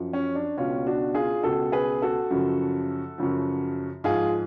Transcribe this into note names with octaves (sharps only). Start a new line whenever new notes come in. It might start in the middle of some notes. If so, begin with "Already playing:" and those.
Already playing: F#2 F3
C#4
D4
C#2 B2 C#4 F4
D4 F#4
F4 G#4
C#2 B2 F#4 A4
G#4 B4
F#4 A4
F#2 C#3 F3
F#2 C#3 F3
G#2 F3 F4 G#4